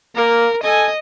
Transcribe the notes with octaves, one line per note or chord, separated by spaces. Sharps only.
A#3 A#4
A4 D#5 G#5